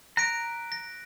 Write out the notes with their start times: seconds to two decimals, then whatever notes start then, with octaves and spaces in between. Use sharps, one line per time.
0.17 A#5 F#6 B6 D7
0.72 A#6